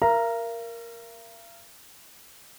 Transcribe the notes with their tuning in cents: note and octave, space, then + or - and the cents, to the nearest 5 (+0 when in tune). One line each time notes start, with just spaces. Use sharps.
A#4 +0 F5 -45 A#5 +0